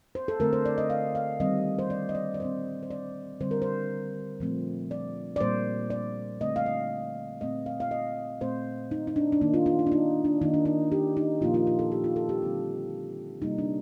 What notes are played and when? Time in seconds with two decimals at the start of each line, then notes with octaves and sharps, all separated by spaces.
0.15 C5
0.28 A4
0.40 D3 A3 C4 A#4
0.53 C5
0.65 D5
0.78 D#5
0.90 F5
1.15 F5
1.40 D#3 G3 C4 D#5
1.79 C5
1.90 D5
2.09 D#5
2.15 D5
2.34 D5
2.40 A#2 G3 C4 C5
2.83 C5
2.91 D5
3.41 D3 G3 C4 C5
3.51 A#4
3.62 C5
4.40 A#2 F3 A3 C4
4.91 D5
5.36 D5
5.41 A#2 G3 A#3 C5
5.90 D5
6.41 D3 A3 C4 D#5
6.56 F5
6.66 D#5
7.41 A#2 A3 C4 D#5
7.66 F5
7.80 F5
7.91 D#5
8.41 A#2 A3 C4 C5
8.91 D#4
9.07 D#4
9.16 D4
9.32 D4
9.41 D#3 A#3 D#4
9.54 F4
9.66 F4
9.79 D#4
9.87 D4
9.92 D#4
10.25 D4
10.41 D#3 A#3 D#4
10.54 D4
10.65 D#4
10.92 G4
11.17 D#4
11.41 A#2 F3 A#3 F4
11.54 F4
11.67 F4
11.79 A4
11.92 G4
12.04 F4
12.16 A4
12.29 G4
12.42 D3 G3 C4
13.42 C3 G3 A#3 D#4
13.58 D4